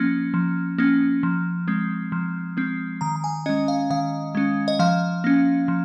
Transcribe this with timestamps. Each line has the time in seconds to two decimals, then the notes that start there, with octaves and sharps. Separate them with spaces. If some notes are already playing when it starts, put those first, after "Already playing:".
Already playing: F3 A#3 C#4
0.34 F3
0.78 A#3 C#4
1.23 F3
1.68 G#3 C4
2.12 F3
2.57 G#3 C4
3.01 D#3 A#5
3.16 A#5
3.24 G#5
3.46 G#3 C#4 D#5
3.68 F5
3.90 D#3 F5
4.35 G#3 C#4
4.68 D#5
4.79 F3 F5
5.24 A#3 C#4
5.68 F3